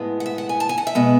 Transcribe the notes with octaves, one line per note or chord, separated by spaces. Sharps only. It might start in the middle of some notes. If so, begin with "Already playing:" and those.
Already playing: A2 G#3 B3
F#5
E5
F#5
G#5
A5
G#5
F#5
E5
B2 G#3 B3